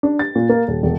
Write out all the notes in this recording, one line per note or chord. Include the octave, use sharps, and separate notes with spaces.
D4
A6
A#2
A#3
D#1
E1